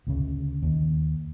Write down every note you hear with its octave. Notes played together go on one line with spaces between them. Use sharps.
D2 C#3
D#2